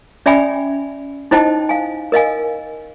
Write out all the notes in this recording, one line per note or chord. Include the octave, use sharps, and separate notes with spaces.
C#4 D5 E5 G5 G#5 B5
D#4 E4 C5 D#5 G5 A5
F5 G#5
A#4 D#5 F5 G#5